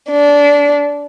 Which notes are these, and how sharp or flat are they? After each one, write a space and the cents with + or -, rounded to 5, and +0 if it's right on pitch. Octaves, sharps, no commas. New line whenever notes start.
D4 -20